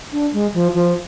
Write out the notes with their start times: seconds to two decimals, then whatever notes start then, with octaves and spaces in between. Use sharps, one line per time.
0.13 D4
0.33 G#3
0.54 F3
0.74 F3